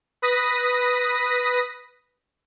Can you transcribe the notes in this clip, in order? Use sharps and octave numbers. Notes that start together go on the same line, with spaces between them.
B4 D#6 A#6 B6